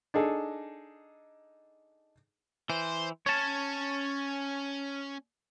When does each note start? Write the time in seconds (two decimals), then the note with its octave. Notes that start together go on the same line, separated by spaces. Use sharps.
0.14 D4 D#4 G#4 A4
2.70 E3 C5
3.26 C#4 C#5 A5